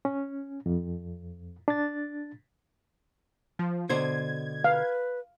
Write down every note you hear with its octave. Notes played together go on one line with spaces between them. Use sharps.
C#4
F2
D4 A6
F3
B2 D3 C5 G#6
B4 F5